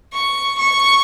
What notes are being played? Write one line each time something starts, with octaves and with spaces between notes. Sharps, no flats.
C#6
C#6